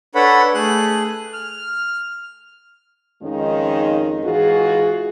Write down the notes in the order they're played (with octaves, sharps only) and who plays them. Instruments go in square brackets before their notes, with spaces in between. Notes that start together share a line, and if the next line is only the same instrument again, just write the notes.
[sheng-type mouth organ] D4 A4 B4 C#5 F#5 B5
A3 G#4 F#6
F6
[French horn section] F2 D#3 G#3 C#4 D#4 F4
G#2 E3 F4 F#4 G#4